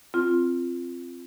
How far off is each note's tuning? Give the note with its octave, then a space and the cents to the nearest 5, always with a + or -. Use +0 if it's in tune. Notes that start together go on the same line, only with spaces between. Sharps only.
C4 +0 F4 -15